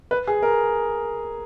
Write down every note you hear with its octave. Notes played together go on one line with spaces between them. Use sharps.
B4
G#4
A#4